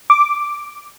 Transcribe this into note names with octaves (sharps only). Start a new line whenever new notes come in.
D6